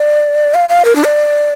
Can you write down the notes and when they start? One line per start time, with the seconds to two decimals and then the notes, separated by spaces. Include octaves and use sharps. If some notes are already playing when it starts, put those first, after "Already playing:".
Already playing: D5
0.54 F5
0.69 F5
0.85 A#4
0.96 D4
1.05 D5